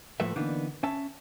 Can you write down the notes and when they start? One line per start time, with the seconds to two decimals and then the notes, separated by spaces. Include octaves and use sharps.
0.20 A2 F3 A3 A#3 B4 E5
0.36 D3 E3 A#3 B3 D4 D#4
0.83 C#4 E5 A5